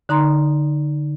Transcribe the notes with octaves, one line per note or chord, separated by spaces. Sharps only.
D3 D#4 A#5 C6